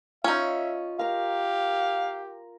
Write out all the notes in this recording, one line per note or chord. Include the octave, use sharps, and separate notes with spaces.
C#4 D#4 F4 E5
G4 A#4 F5 A#5